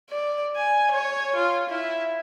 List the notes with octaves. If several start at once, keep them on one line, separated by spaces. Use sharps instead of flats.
D5
G#5
C#5
F4
E4